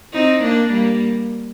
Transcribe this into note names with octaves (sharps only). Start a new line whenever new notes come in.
C4 D#4
A#3 D4
G3 A#3